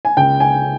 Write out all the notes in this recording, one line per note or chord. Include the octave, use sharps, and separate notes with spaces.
G#5
C#2 G5
G#5